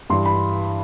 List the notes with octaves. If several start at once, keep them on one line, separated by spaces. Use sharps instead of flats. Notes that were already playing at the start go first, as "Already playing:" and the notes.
G2 E3 G3 C6
B5